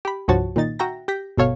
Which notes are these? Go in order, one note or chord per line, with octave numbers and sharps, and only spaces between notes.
G4 B5
C2 G2 F3 F#4 C#5 A5
A#2 D#3 D#4 A6
F#4 E5 G5 A#5 A#6
G4 G6 A#6 B6
G1 B2 A4 C#5 F5